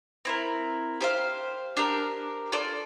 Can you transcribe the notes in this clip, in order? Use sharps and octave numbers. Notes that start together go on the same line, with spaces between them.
C4 E4 A#4
G4 C5 F5
D4 G4 A#4
F4 A4 D5